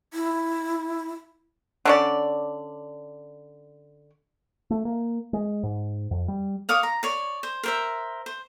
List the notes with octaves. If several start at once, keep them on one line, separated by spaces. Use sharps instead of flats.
E4
D3 C#4 D5
A3
A#3
G#3
G#2
F2
G3
C#5 F5 D6 D#6
A#5
C#5 D5
C5
A#4 C5 E5
C5